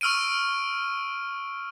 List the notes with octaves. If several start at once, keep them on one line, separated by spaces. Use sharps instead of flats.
C#6 E6 F6 D7 D#7